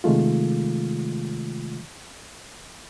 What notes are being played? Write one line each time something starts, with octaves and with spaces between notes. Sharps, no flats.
C3 D#3 G#3 A3 F4